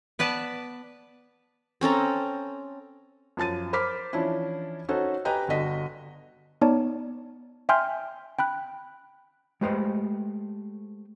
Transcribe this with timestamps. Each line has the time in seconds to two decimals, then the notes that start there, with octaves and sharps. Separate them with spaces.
0.19 B3 B4 D5 A5
1.81 C4 C#4 A4 A#5
3.37 F#2 F3 A5 A6 D#7
3.73 A#4 C5 B5 D6 F6 B6
4.13 E3 F3 C#4 D4 E4
4.89 C#4 D#4 F#4 A4 C5
5.25 G4 B4 D#5 G5 G#5 A#5
5.48 G1 D3 F#4 D#5 B6
6.61 B3 D#4 C#5 D5 A5
7.69 E5 G5 G#5 C6 F6 G6
8.39 G5 B5 F#6
9.61 G#3 A3 G4 B4 C5 D#5